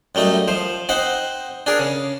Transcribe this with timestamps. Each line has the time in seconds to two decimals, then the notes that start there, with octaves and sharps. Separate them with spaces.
0.15 F#2 G3 A3 D#4
0.48 F3 C5
0.89 C4 D#4 C5 F#5
1.66 D4 G#4 A#4
1.79 C#3